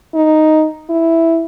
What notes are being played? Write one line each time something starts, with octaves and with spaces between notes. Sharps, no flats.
D#4
E4